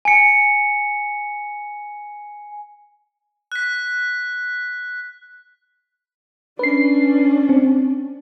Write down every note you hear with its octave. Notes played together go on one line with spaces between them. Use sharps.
G#5 C#7
F#6 B6
C#4 D4 B4 C7
C4